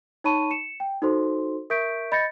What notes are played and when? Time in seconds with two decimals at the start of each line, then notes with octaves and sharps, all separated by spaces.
0.24 D#4 C#5 A5 B5 C#6 D#7
0.51 C#7 E7
0.80 G5
1.02 D#4 F#4 A4 C5 C6
1.70 A#4 E5 C#6 G6 B6 D7
2.12 D#5 B5 G6 A6 A#6 C#7